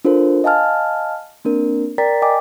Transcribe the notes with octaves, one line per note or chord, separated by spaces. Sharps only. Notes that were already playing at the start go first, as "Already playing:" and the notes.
D4 F4 A4 A#4 C5
D#5 F5 G#5 A5 F6
A#3 C4 D4 A#4
A#4 D5 G5 A#5 A6 B6
D#5 G5 G#5 D6